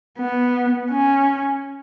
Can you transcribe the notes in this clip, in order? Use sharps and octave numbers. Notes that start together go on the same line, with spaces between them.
B3
C#4